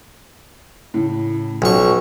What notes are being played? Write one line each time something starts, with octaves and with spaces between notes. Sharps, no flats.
A2 C#3
B1 F3 F#3 C#4 F#4 C#6